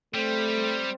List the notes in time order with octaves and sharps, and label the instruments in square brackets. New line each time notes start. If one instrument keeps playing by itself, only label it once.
[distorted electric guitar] G3 [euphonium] A3 [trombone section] C4